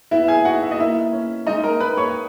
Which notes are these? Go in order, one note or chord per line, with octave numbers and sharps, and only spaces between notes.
B3 E4 E5
G#4 G#5
D#4 F#4 F#5
E5
D#5
A#3 E4 E5
C#4
G#3 D#4 D#5
A#4 A#5
D#4 B4 B5
C#5 C#6